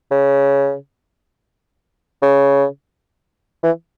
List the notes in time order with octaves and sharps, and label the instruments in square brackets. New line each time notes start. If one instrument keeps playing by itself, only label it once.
[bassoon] C#3
C#3
E3